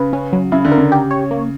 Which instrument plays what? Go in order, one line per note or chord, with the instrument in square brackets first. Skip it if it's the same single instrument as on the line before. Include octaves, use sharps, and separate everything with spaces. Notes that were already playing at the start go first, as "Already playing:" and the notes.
Already playing: [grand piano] C#3 [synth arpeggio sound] B4
[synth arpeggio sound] C#4
F#3
[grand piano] C#3 [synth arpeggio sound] E4
[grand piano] D3
[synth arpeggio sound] A#4
[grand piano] C#3
[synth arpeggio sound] G4
C#5
A#3